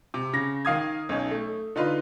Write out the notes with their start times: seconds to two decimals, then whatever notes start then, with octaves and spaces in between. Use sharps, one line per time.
0.14 C3
0.33 C#3 A#6
0.65 D#3 F5 D#6 G#6
1.09 B1 C#4 D#4
1.31 A3
1.76 D3 D#4 F4 B4